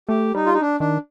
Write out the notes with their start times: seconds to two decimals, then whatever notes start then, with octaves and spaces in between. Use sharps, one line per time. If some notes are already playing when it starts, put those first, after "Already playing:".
0.09 A3 G4
0.34 G3 D#4
0.46 F4
0.54 D#4
0.61 D4
0.80 D#3 D4